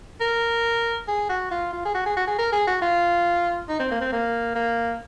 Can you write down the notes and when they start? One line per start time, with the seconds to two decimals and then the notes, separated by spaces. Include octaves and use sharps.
0.21 A#4
1.08 G#4
1.29 F#4
1.51 F4
1.73 F4
1.85 G#4
1.95 F#4
2.06 G#4
2.17 F#4
2.27 G#4
2.39 A#4
2.52 G#4
2.67 F#4
2.82 F4
3.69 D#4
3.80 C4
3.91 A#3
4.01 C4
4.12 A#3
4.55 A#3